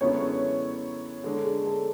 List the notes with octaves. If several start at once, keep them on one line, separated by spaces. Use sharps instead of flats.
F#2 D3 G#3 B3 E4 C#5
D3 G#3 D4 A4
G#4
A4